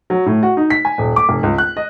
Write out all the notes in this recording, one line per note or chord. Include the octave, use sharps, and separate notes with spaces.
F#3
A2
F#4
D#4
B6
G#5
D#1
D6
F1
C#2
F#6
D#5